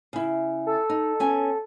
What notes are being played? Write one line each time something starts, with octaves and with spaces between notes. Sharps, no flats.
C#3 E4
A4
D#4
B3 C#4 G#5